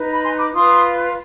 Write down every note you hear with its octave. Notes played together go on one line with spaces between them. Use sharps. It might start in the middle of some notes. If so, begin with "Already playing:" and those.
Already playing: D#4 B4
B5
G#5 C6
B5 D6
F4 B4 C6 D#6